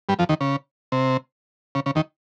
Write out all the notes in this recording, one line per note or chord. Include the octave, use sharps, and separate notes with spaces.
G2 G3
F2 F3
D#2 D#3
C#3
C3
C#3
C#3
D#2 D#3